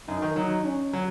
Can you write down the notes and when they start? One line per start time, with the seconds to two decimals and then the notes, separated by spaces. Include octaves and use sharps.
0.08 F#2 D#4
0.22 D#3
0.36 F#3 D#4
0.64 C#4
0.93 F#3